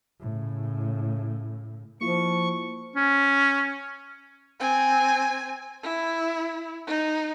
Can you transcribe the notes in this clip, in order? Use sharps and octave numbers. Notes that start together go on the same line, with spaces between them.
A2 C#3
F3 A#3 E4 F4 C#6
C#4
C4 G#5
E4
D#4